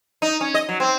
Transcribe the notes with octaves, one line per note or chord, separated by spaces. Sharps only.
D#4
C#4
D#5
F#3
C4